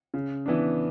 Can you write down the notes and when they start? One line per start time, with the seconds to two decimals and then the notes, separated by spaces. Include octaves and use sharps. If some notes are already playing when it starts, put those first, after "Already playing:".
0.14 C#3
0.46 E3 B3 D4